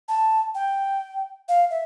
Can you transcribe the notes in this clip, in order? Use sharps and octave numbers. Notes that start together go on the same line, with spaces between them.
A5
G5
F5
E5